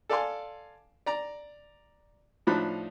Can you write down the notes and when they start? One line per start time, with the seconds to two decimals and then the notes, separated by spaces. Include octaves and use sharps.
0.09 A4 D5 F5 G#5 C6
1.06 D5 A#5
2.47 A2 F3 D4 D#4 B5 F#6